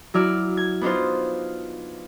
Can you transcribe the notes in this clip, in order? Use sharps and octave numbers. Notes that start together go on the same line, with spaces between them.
F#3 E4 D5 F6
G#6
B3 D4 D#4 F4 C5